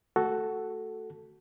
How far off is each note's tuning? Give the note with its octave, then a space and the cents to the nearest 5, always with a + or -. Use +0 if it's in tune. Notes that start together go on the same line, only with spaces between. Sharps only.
A3 +0 F#4 +10 A4 +0